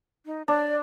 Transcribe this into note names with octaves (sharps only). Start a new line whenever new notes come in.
D#4
D4 D5